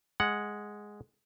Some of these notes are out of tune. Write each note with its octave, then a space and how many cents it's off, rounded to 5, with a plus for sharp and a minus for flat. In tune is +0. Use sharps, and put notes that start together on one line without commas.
G#3 +0 F#5 +0